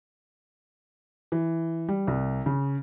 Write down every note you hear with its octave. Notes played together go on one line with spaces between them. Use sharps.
E3
G3
C2
C#3